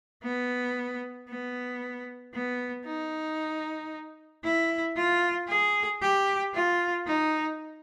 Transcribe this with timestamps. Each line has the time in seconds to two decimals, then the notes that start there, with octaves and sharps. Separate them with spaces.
0.23 B3
1.29 B3
2.34 B3
2.86 D#4
4.43 E4
4.96 F4
5.48 G#4
6.02 G4
6.54 F4
7.06 D#4